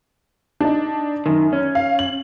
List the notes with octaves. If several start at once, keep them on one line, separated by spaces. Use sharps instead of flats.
D4 D#4
F#2 D#3
C#4
F5
F#7